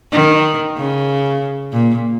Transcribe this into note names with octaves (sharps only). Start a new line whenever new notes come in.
D#3
C#3
A#2